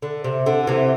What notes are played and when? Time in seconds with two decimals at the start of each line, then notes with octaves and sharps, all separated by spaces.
0.02 D3
0.24 C3
0.46 D3
0.67 C3 E3